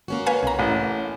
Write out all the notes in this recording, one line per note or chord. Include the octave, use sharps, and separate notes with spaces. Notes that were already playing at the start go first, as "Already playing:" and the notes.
A#3 C#4 F#4
B4 F5 G#5
C2 A#5
A1